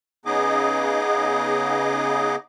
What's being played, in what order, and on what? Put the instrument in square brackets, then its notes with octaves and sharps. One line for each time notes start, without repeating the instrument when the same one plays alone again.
[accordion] C#3 B3 D#4 G#4 D#5 D6